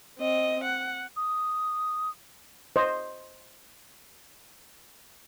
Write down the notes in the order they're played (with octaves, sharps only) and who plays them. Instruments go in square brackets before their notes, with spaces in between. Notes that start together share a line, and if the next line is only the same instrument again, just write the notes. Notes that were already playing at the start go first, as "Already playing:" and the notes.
[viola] C4 D#5
F#5
[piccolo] D#6
[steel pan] C5 D#5